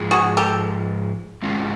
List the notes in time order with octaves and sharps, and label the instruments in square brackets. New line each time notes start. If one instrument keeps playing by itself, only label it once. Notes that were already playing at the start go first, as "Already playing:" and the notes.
Already playing: [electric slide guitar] G#2 F3 G#3
[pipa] F#4 G#4
G4 A4
[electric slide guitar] G#2 D#3 G#3 C#4 F4